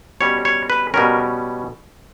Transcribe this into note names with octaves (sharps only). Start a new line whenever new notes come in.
B2 G3 C#4 C#5
C#5
B4
B2 G3 C#4 A#4